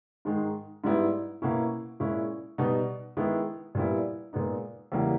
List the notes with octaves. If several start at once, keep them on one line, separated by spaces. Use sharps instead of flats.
G#2 D#3 G#3 D#4
G#2 G3 B3 E4
B2 A#3 C#4 E4
A#2 G#3 C#4 E4
B2 G3 B3 D#4
D#3 G#3 B3 E4
A#2 G3 B3 E4
A#2 G#3 B3 D#4
E2 C#3 E3 G3 A#3